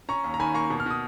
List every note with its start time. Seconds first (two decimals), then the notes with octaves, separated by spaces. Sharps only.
0.09 C#4 A#5 C#6
0.24 D#2
0.34 A#5
0.40 D#3 G#5 B5
0.54 A#3 A#5 C#6
0.70 B2
0.80 F6
0.86 B2 D#6